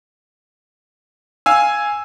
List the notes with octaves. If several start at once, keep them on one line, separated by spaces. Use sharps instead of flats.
F5 G#5 E6